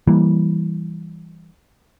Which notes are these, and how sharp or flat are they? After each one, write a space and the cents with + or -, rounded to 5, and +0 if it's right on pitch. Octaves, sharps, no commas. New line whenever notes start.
E3 +0 G3 +0 A#3 +0